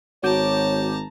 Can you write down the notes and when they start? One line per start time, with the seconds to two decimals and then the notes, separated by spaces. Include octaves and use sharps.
0.23 G#1 F#4 C#5 A5 A#5 D6 G6